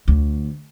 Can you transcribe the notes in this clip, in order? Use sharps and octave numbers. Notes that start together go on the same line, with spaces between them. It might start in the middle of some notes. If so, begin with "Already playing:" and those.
D2